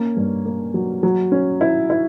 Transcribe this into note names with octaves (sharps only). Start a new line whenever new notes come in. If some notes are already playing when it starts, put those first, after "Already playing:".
Already playing: A#3 C#4
G2
A#3
F#3
F#3
C#4
E4
E4